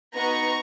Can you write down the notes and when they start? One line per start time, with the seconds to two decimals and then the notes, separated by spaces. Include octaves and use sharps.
0.16 B3 D#4 F#4 A#5 C#6